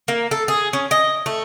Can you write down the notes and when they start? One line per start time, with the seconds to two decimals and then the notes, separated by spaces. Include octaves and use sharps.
0.08 A#3
0.31 A4
0.48 G#4
0.73 C#4
0.91 D#5
1.26 A3